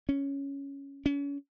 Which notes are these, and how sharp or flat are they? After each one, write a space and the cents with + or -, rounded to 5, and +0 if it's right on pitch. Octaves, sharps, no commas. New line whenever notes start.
C#4 +5
C#4 +35